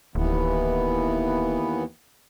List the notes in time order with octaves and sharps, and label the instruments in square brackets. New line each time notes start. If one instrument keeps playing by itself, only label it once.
[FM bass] D1 [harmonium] D#2 E3 B3